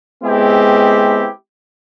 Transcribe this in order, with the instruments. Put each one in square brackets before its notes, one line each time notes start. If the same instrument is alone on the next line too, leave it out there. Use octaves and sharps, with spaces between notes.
[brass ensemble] G#3 B3 C4 E4 G4